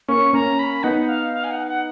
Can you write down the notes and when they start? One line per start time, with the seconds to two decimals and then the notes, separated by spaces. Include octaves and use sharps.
0.08 A#3 C#4 C#6
0.33 A#3 C#4 A#5
0.59 B5
0.83 B3 D#4 F#5
1.09 F5
1.34 F5
1.44 G#5
1.51 F#5
1.67 F#5